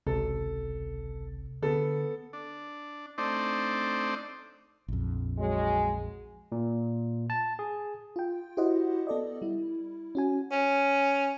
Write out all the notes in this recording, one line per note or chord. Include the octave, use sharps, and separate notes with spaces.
G#1 C#2 C3 A4
D3 B3 A4
D4
A3 C4 D4 D#4 C5 D5
A#1 F2
F#3 G#3
A#2
A5
G#4
F4 G5
E4 F#4 G4 C5 D#5 F#5
B3 A4 D5 D#5
G3 E4
C#4 F#4 G#5
C#4